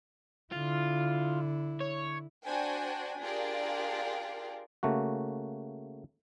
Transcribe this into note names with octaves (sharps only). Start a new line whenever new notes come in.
D3 E4 F4
C#5
D4 F#4 C5 G5 G#5
D4 F4 G4 G#4 A#4 D5
C#3 A3 A#3 F#4